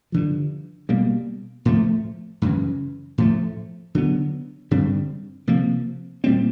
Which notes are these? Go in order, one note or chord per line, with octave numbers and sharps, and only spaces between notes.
G2 D3 F3
B2 G3 A#3
A2 F3 A3
F#2 C#3 E3
A2 F3 A3
D3 F#3 B3
G2 D3 G3 C4
C3 F3 A#3
A#2 G3 C4